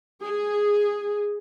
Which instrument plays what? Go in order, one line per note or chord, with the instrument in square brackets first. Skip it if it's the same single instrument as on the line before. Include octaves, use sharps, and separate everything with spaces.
[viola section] G#4